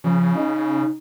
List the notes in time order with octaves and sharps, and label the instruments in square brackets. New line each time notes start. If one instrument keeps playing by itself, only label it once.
[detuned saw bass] C#3 [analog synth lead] F3
[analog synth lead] D#4